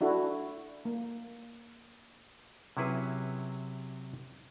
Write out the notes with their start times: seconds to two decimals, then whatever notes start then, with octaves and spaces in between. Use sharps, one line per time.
0.01 D4 E4 F#4 A4
0.85 A#3
2.77 C3 F#3 C#4 E4 G#4 B4